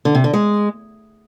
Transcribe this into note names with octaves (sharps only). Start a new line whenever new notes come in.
D3
C3
D3
G#3